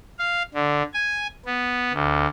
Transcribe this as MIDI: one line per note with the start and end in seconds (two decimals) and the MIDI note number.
0.19 0.43 77
0.54 0.82 50
0.94 1.27 80
1.46 1.92 59
1.93 2.26 38